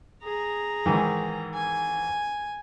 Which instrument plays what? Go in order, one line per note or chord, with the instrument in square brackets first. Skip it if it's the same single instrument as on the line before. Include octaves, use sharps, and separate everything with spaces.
[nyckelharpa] G#4 A#5
[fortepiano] G#2 D#3 E3
[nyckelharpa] G#5